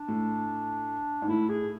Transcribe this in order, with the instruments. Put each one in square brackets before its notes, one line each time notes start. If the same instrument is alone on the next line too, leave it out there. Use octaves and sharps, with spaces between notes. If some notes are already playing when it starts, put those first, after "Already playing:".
Already playing: [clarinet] D4
[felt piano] A2
G#2
[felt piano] A2 [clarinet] E4
[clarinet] G#4